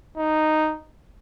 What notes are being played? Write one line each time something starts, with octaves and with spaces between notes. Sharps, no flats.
D#4